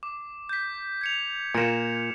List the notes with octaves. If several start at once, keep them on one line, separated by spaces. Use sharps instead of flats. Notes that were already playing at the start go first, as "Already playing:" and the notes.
D6
G6 B6
G#6 C#7 F7
A#2 A#3 C#7 E7